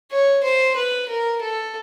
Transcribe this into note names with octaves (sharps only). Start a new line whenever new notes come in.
C#5
C5
B4
A#4
A4